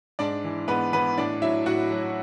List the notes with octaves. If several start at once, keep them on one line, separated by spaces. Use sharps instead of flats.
G#2 D4 D5
E3
G#2 B3 B4
E3 B3 B4
A2 D4 D5
F#3 E4 E5
A2 F#4 F#5
F#3